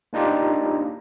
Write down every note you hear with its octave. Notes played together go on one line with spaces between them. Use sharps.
A#3 D4 D#4 F4 G4